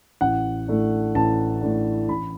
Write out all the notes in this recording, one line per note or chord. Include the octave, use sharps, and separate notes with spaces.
A1 F#5
A2 A3 D4
A1 A5
A2 A3 D4
A1 B5